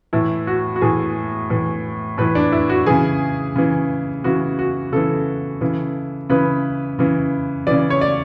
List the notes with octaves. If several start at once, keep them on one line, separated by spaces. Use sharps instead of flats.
A2 E3 E4
F#4
F#4
A2 E3 G#4
A2 E3
A2 E3 B4
D4
E4
F#4
C#3 E3 G#4
C#3 E3
C#3 E3 F#4
F#4
C#3 E3 A4
C#3 E3
C#3 E3 B4
C#3 E3
C#3 E3 D5
C#5
D5